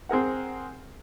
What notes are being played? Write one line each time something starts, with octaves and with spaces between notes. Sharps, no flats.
C4 G#4 A#4 F#5